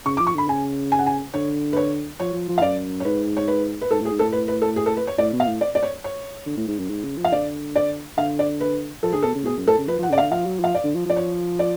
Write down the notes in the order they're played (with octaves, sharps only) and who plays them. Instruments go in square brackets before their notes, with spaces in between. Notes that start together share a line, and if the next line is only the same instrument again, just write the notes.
[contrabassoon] C#3 [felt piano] C#6
[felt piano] D6
[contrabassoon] F3
[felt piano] C#6
[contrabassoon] D3 [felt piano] B5
[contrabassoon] C#3 [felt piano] G#5
[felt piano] G#5
F#5
G#5
[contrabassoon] D3 [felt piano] C#5
[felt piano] B4
C#5
[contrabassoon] F3 [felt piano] C#5
[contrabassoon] F3
F3
[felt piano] F5
[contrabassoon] F#2 [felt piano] D5
[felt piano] C#5
[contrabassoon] G#2 [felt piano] B4
[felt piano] C#5
B4
B4
[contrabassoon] G#2 [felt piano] A4
[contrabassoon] A2 [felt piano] G#4
[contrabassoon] G#2
[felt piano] A4
[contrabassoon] A2
[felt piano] B4
B4
A4
G#4
A4
B4
C#5
[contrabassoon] A2 [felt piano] D5
[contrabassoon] B2
[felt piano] F5
[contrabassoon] A2
[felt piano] D5
D5
C#5
C#5
[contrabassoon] D3
A2
G#2
F#2
G#2
C#3
F3
[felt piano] F5
[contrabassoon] D3 [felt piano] D5
[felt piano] D5
[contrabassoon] D3 [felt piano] F5
[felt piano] D5
B4
[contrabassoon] F3 [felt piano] A4
[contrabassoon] D3 [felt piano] G#4
[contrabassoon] B2 [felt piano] A4
[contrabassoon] C#3
A2
[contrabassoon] B2 [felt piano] G#4
[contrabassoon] F#2
[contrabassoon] A2 [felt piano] A4
[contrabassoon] C#3
[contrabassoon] F3 [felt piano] B4
[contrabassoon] F3 [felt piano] F#5
[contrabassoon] C#3 [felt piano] D5
[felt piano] F5
[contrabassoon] D3
[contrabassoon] F3 [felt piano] F5
[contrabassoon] F#3
[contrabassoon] F3 [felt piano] F5
[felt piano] D5
[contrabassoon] D3
F3
[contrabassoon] F3 [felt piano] D5
[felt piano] C#5
D5